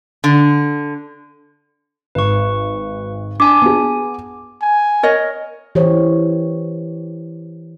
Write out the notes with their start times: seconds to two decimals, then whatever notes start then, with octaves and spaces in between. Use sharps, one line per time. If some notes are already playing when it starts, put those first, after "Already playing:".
0.24 D3
2.15 G#1 B4 C#6
3.40 D4 G#5 A5 D6
3.62 B3 G#4 G#5
4.62 G#5
5.03 A#4 C#5 D#5
5.75 E3 G4 C5 C#5